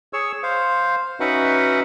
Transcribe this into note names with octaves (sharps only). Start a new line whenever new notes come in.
G#4 C#5 C#6 E6
C5 F5
C#4 D#4 F#4 B4 E5 F#5